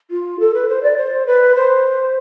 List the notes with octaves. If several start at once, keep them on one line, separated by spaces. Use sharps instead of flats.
F4
A4
B4
C5
D5
C5
B4
C5